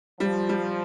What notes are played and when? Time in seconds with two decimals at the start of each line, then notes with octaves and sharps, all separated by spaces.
0.20 F3 G3
0.49 G3